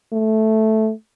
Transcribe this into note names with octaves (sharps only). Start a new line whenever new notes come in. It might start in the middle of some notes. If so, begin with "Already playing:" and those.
A3